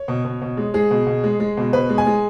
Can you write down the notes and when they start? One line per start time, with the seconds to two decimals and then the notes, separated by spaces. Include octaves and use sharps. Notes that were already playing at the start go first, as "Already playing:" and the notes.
Already playing: C#5
0.08 B2
0.25 B2
0.42 B2
0.57 G#3
0.74 G#3 G#4
0.91 B2
1.07 B2
1.24 G#3
1.40 G#3
1.57 B2
1.73 B2 B4
1.89 G#3
1.98 G#5
2.07 G#3